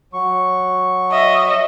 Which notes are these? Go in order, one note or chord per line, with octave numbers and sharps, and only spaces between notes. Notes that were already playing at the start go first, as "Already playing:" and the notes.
F#3 C#6
D#5 E5